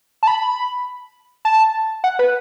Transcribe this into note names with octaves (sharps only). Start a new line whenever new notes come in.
A5
B5
A5
F#5
B4